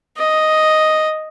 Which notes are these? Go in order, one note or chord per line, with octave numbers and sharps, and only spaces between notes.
D#5